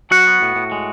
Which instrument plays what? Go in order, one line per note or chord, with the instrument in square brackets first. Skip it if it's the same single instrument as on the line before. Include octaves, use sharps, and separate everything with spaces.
[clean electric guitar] F#3 F#4 F#5
B3
A2
A2
G#3